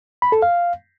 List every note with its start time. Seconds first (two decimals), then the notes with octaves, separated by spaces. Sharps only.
0.22 B5
0.32 A4
0.42 F5